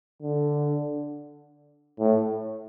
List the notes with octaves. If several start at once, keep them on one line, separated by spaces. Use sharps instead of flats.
D3
A2